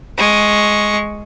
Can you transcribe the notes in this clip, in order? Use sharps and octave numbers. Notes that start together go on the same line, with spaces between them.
G#3 C#6